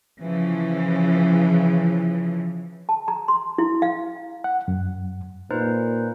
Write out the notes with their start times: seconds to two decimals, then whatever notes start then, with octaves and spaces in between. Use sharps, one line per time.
0.20 C#3 E3 F3
2.89 A5
3.08 A#5
3.28 C6
3.58 E4
3.82 F5
4.44 F#5
4.68 F#2
5.51 A#2 D#4 B4 C5